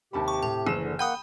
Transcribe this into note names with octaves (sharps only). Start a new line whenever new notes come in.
D#2 C3 G4 A5 B5
C#6
A2 A5
F#1 E3 G#4 E7
D3
A#3 F#5 G5 B5 D#6 G6